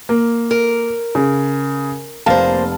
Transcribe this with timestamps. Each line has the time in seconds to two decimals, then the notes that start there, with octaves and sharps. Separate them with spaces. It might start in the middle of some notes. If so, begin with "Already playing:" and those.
0.09 A#3
0.51 A#4
1.15 C#3
2.26 F1 A#3 C5 F5 A5